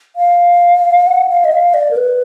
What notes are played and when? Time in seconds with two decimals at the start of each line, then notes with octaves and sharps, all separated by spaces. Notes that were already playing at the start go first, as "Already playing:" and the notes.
0.16 F5
1.07 F#5
1.28 F5
1.44 D#5
1.52 F5
1.74 D5
1.91 A#4
1.96 B4